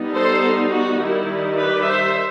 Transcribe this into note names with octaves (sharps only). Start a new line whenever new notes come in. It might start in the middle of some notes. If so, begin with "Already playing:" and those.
Already playing: G3 B3 D#4
A4 C5
F#4
D#3 G3 D#4 E4
G4 B4
C5 E5